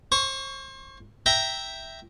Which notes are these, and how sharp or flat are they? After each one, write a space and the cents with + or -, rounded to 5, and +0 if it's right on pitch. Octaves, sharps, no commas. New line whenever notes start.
C5 +35 C#6 +10
E5 +0 G5 +0 A#5 +0